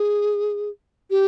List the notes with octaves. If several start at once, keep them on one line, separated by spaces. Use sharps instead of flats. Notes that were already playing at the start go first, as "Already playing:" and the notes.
Already playing: G#4
G4